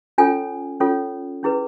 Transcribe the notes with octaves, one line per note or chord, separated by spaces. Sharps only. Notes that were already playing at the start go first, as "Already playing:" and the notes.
C#4 F4 A4 C#5 G#5
C#4 F4 A4 C#5
C#4 E4 G#4 B4